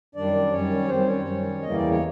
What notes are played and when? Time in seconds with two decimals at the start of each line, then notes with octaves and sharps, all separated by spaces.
0.15 F#2 D#3 G3 D4 D5
0.51 F#2 D#3 G3 C#4 C#5
0.89 F#2 D#3 G3 C4 C5
1.07 C#4 C#5
1.25 F#2 D#3 G3
1.62 E2 C#3 E3 G3 A#3 D#5
1.75 D5
1.90 C#5